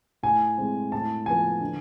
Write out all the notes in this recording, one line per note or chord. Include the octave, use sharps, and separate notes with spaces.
A2 G#5
G#3 C4
A2 A5
F3 B3 G#5
D3